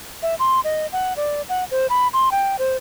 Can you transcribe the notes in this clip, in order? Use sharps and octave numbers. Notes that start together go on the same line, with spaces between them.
E5
C6
D#5
F#5
D5
F#5
C5
B5
C6
G5
C5